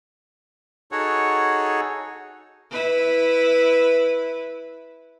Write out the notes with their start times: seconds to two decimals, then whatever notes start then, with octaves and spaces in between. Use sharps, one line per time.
0.92 D#4 F#4 G#4 A4 C#5 F#5
2.71 E4 B4